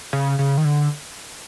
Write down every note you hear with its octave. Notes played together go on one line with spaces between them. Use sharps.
C#3
C#3
D#3
D3